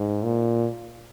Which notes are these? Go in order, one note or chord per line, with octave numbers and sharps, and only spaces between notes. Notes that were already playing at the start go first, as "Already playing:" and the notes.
Already playing: G#2
A#2